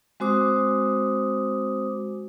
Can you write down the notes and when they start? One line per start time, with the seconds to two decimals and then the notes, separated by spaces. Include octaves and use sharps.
0.20 G#3 C4 F#4 C5 D6 D#6